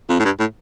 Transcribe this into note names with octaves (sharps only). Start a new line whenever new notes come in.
F2
A2
G2
A2